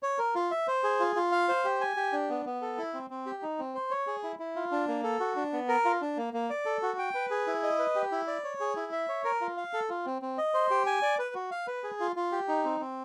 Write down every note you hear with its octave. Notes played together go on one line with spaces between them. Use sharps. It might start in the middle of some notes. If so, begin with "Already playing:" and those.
C#5
A#4
F4
E5
C5
G#4
F4
F4
F5
C5
G4
G#5
G4
D4
B3
B3
A4
E4
C4
C4
G4
D#4
C4
C5
C#5
G#4
E4
E4
F4
D4
A#3
A4
F#4
D4
B3
A#4
F4
D4
A#3
A#3
D5
A4
F#4
G5
B4
G#4
E4
D#5
B4
G4
E4
D5
C#5
G#4
E4
E5
C#5
A#4
F4
F5
A4
F4
C4
C4
D#5
C5
G4
G#5
D5
B4
F#4
F5
B4
G#4
F4
F4
G4
D#4
C4
C4